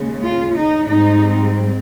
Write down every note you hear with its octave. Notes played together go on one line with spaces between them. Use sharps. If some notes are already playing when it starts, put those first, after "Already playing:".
Already playing: D#2 C#3 G#3
F4
D#4
G#2 G3 C4 D#4